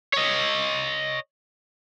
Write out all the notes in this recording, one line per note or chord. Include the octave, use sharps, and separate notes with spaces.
C#5 D#5